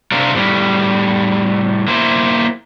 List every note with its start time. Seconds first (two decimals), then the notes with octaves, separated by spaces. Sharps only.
0.12 C3 A3 C4 D4 F4 A#4
0.35 A2 G3
1.88 A#3 E4 C5